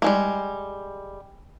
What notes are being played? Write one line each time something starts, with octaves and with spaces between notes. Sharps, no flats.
G3 G#3 A#3